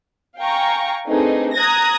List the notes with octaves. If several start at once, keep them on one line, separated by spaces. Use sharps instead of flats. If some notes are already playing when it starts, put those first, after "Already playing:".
F5 G5 G#5 A#5 C#6
A3 C4 D4 D#4 G#4 B4
A#5 D#6 F#6 G#6 A#6